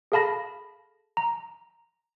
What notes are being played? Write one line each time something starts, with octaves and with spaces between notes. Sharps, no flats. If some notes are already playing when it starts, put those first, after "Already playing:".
G#4 A4 F5 A5 B5 A#6
A#5